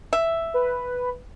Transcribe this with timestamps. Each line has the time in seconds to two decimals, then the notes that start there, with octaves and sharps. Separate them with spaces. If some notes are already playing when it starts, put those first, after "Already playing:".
0.13 E5
0.54 B4